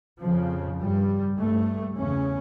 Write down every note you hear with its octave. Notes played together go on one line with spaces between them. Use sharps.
F2 C#3 F3
G2 G3
G2 A3
E2 C#3 C#4